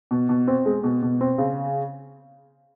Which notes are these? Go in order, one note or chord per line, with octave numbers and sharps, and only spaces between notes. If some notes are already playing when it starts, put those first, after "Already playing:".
B2
B2
C4
G#3
B2
B2
C4
C#3